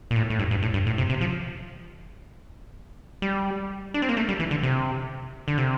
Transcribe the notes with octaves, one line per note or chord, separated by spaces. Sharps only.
A#2
A2
A2
G2
G2
A2
G2
A2
C3
C3
F3
G3
D4
C4
A#3
A3
G3
E3
D3
C3
D3
C3